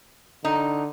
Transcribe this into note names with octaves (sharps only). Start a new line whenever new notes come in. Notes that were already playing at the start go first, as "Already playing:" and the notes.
D3 D#4